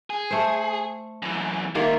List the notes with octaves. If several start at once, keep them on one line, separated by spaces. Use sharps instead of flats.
G#4
A3 C5
F#2 E3
G#2 D#3 A#3 F4 E5